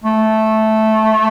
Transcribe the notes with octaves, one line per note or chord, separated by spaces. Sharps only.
A3